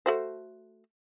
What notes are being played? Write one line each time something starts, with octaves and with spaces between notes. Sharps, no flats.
A3 F#4 C5